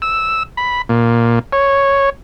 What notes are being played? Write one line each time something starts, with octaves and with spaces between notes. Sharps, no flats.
E6
B5
A#2
C#5